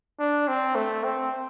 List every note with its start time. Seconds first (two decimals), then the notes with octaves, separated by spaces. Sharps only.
0.19 D4
0.48 C4
0.75 A3
1.04 C4